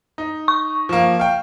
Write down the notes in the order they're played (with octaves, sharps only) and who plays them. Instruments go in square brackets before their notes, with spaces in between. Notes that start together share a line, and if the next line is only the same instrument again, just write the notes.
[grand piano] D#4
[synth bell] C#6
[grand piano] F3 A#3
F5 G5